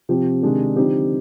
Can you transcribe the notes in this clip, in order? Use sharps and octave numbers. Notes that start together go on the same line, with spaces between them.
C3 F3 C4 G4
C3 D#3 G#3 D4 G4
D3 F3 C4 D#4 G4